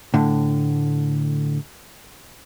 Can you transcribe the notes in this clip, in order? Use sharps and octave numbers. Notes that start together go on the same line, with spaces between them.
A2 D3